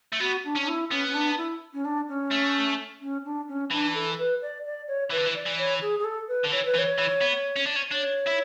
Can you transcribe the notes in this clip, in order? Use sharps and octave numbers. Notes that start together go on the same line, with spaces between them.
A3
B3 F#4
D4
C#4 D4
E4
B3 C#4
C#4
D4
E4
C#4
D4
C#4
A3
C#4
D4
C#4
E3 D4
A4
B4
D5
D5
C#5
E3 B4
D3
E3
D5
E3
C#5
G#4
G#4
A4
B4
D3
E3 C#5
B4
E3
C#5
E3
B3
C#4
D4
C#4
D4 C#5
E4